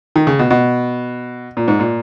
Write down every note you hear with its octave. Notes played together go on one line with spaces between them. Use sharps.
D#3
C#3
B2
B2
A#2
G#2
A#2